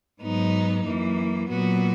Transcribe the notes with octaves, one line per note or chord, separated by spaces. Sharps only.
G#2 F#3 B3 D#4
F#2 E3 A#3
A#2 F#3 B3 F#4